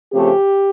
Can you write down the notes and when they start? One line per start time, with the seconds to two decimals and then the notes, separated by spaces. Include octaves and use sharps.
0.13 C#3 F3 A3 C4 G4